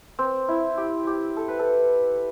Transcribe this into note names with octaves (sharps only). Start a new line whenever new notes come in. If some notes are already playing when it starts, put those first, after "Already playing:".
C4
E4
G4
G4
A4
B4
A4